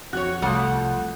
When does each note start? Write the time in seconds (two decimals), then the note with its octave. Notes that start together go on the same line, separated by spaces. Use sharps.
0.13 F2 F#4 C#5 F#6
0.42 C2 F3 G3 A3 F#5